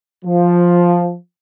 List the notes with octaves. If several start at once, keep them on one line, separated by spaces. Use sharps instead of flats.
F3